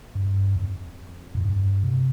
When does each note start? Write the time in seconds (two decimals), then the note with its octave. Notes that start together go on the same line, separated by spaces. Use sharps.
0.15 G2
0.56 F2
1.35 A2
1.41 G2
1.84 C3